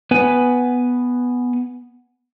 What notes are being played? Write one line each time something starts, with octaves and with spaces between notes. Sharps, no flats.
B3 B4 G#5